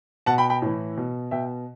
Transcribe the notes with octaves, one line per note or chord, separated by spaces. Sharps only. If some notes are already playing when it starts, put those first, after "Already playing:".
B2 F#5 A5
G5 B5
G5 B5
A2 E3
B2
B2 E5 G5